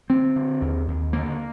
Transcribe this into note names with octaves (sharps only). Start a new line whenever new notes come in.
D3 C4
D3
D#2
D#2
D3 A#3